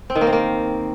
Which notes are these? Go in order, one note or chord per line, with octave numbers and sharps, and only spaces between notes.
C4
D#3
A#3
C4
A#3